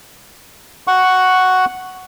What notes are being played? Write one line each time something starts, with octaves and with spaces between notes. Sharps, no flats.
F#5 C#6